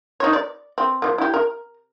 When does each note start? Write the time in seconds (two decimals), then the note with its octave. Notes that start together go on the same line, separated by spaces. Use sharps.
0.20 D#4 C#5
0.33 D5
0.78 C4
1.02 F3 A#3
1.18 E4 G4
1.34 A#4